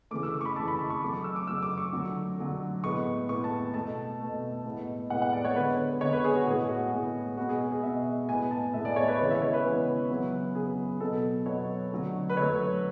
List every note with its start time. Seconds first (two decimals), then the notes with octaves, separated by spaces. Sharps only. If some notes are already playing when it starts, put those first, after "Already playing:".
0.11 C#3 E3 A3 D6
0.23 E6
0.34 D6
0.41 C#6
0.45 B5
0.56 C#3 E3 A3 A5
0.68 B5
0.79 C#6
0.90 C#6
1.02 C#3 F#3 A3 D6
1.13 C#6
1.24 E6
1.36 D6
1.47 C#3 F#3 A3 E6
1.62 D6
1.78 C#6
1.93 D3 F#3 A3
2.38 D3 F#3 A3
2.83 A2 G#3 B3 C#6
3.29 A2 G#3 B3 C#6
3.44 A5
3.74 B2 A3 A5
4.20 B2 A3
4.65 A2 G#3 B3
5.10 A2 G#3 B3 F#5
5.22 F#5
5.33 D5
5.45 C#5
5.56 D3 G#3 B3 B4
6.01 D3 G#3 B3 C#5
6.13 B4
6.24 G#4
6.35 F#4
6.47 A2 G#3 B3 G#4
6.69 F#4
6.92 A2 G#3 B3 G#4
7.37 B2 G#3 B3 F#4
7.49 G#4
7.60 G#4
7.72 G#4
7.83 B2 G#3 B3 E5
8.28 A2 G#3 B3 G#5
8.51 A5
8.74 A2 G#3 B3 E5
8.85 D5
8.96 C#5
9.08 B4
9.19 C#3 E3 G#3 B3 C#5
9.31 E5
9.42 C#5
9.53 B4
9.65 C#3 E3 G#3 B3
10.10 C#3 F#3 B3
10.55 C#3 F#3 B3 G#4
11.00 B2 F#3 B3 A4
11.46 B2 F#3 B3 C#5
11.91 D3 F#3 A3
12.30 B4
12.37 D3 F#3 A3 C#5